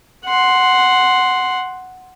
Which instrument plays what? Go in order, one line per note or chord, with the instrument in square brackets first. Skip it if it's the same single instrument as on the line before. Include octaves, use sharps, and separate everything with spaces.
[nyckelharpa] F#5 C6